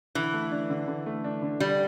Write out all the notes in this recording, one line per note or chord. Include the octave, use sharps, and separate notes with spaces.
D3 E3
A3
D4
D3
D3
A3
D4
D3
D3 G3